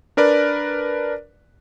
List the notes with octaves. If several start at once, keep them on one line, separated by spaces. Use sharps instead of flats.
D4 A#4 B4 D5